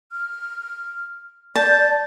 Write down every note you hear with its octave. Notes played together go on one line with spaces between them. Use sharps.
F6
D5 A5 G6